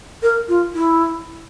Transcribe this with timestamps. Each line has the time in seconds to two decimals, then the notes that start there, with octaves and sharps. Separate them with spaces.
0.23 A#4
0.48 F4
0.74 E4